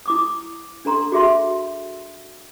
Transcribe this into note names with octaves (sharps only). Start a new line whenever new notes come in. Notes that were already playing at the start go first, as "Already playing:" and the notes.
E4 D6 D#6
D4 A4 A#5 C6
F#4 G#4 E5 C6